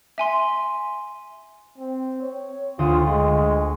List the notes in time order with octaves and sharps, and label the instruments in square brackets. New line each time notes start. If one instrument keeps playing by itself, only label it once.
[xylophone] E5 G#5 C6
[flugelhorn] C4
C#5
[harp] D2 C5 D#6 [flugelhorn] F4
[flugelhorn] G#3